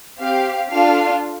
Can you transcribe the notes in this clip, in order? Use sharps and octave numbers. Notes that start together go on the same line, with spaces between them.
C4 G4 F5
D4 F4 A4 F5